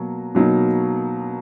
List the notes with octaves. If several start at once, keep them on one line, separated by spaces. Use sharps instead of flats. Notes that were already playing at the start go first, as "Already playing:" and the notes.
Already playing: B2 F#3 A#3 F#4
B2 F#3 A#3 D#4